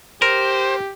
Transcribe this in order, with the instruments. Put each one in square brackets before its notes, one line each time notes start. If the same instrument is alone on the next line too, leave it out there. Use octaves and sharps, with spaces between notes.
[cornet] G4 [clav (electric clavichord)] A#4 [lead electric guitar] C5